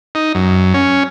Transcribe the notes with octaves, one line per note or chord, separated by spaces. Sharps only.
D#4
F#2
C#4